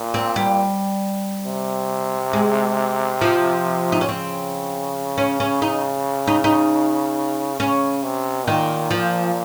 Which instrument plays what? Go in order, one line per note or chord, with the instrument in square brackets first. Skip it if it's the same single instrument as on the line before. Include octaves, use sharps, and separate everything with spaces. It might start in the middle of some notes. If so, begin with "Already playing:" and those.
Already playing: [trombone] A#2
[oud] C4
G3
[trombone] C3
[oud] G#3
F3
D#4
C#4
[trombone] C#3 [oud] C4
[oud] C#4
C#4
D#4
D#4
D#4
[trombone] C#3 [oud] C#4
[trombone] C3
[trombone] A#2 [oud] D#3
[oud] F3